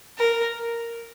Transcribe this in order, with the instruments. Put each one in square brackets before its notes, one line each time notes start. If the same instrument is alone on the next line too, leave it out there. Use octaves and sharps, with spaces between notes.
[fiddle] A#4